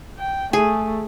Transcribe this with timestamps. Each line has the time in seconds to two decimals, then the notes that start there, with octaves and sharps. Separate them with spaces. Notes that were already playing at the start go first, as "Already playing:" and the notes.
0.19 G5
0.53 A3 G#4